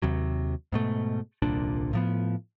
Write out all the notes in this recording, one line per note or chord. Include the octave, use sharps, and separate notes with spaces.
D#2 C3 F#3
G#2 B2 A3
D#1 C2 A#2 D4
A2 F3 B3